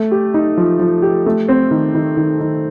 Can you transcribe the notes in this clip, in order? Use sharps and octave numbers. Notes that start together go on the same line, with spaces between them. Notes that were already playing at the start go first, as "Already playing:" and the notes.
Already playing: A3
G4
D#4
F3
F3
G4
A3
C4
D#3
D#3
D#3
D#3